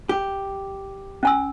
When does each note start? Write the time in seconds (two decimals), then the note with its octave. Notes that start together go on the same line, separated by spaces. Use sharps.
0.09 G4
1.23 C#4 G#5 E6